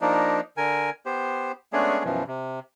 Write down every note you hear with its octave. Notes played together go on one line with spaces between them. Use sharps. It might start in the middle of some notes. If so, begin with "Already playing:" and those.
F3 A#3 D4 D#4
D3 A#4 G#5
B3 G4 C5
G#3 A3 B3 C#4 D4 G#4
F#2 B2 E3 F3
C3